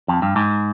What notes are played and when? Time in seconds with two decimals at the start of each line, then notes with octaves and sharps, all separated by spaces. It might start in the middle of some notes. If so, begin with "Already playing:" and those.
0.08 F2
0.22 G2
0.36 G#2